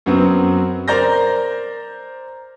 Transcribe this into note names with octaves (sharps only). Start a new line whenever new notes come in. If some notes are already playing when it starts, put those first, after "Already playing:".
F#2 F#3 B3 C4
A#4 C5 D5 A#5 G6 A#6